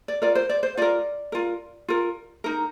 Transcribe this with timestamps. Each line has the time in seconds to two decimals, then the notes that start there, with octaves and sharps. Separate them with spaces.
0.08 D5
0.22 F4 A#4 D5
0.35 C5
0.49 D5
0.63 C5
0.77 F4 A#4 D5
1.32 F4 A#4
1.88 F4 A#4
2.44 D#4 A#4